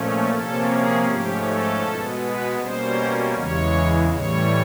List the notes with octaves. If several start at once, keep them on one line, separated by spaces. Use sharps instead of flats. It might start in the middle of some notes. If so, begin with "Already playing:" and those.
Already playing: A#2 F3 A3 C#4
C3 F3 A#3 C#4 A4
G#4
G#2 F3 A3 C#4 G4
A4
B2 G#3 B3
B4
B2 G3 A#3 C#4 C5
E2 C#3 E3 G#3 C#5
A2 E3 G3 C#5